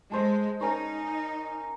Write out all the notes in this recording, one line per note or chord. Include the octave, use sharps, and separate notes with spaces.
G#3 A4 C5
C#4 D#4 A#4 C#5